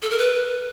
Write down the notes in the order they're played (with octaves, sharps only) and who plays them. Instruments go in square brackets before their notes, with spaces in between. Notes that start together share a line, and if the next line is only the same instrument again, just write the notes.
[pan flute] A4
A#4
B4